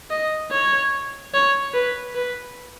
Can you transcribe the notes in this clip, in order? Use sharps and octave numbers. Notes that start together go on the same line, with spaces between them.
D#5
C#5
C#5
B4
B4